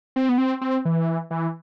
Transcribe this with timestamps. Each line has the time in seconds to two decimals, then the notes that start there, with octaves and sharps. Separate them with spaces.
0.16 C4
0.29 B3
0.38 C4
0.61 C4
0.85 E3
1.31 E3